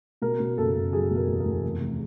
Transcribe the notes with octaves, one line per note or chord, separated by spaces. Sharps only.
B2 A#4
B2
F#1 A4
F#1
F#3 G#4
B2
A#4
E2
A#4
E2
F1
F1